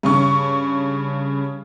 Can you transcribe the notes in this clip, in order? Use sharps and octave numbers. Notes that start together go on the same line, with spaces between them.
G2 C#3 C#6